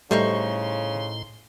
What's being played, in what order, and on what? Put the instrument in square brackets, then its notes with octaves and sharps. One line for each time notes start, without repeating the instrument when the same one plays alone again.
[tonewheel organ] A2 C6 [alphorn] C#3 [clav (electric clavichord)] G3 A3 [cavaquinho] D#4 C5 C#6